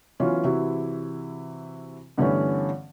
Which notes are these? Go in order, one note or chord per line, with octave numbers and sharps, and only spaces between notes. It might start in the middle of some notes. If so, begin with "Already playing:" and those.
E3 F#3 B3 C#4 F4
C3 E3 E4 F#4
G2 D3 E3 A3 B3 C#4